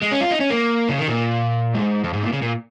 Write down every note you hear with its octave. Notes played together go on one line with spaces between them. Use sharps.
G#3
C#4
F4
D#4
C#4
A#3
C#3
D#3
A#2
G#2
F2
G#2
A#2
C#3
A#2